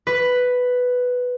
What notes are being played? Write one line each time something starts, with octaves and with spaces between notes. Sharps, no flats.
B4